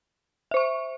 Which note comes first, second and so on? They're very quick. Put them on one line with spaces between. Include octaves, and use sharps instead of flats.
E5 C5 C#6